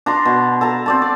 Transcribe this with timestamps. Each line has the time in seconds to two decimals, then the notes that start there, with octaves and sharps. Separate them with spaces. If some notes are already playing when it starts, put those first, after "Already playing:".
0.06 D4 A#5 C6
0.25 B2
0.61 A4 A5 A#5
0.86 C4 D5 A5
1.02 D5